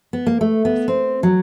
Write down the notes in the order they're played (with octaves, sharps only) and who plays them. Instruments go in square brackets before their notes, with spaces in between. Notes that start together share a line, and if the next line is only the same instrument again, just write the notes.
[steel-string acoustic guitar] B3
A#3
A3
B3
C4
F#3